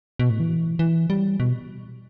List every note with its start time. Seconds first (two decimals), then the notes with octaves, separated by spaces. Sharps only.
0.19 B2
0.30 A2
0.40 E3
0.79 E3
1.10 G3
1.40 B2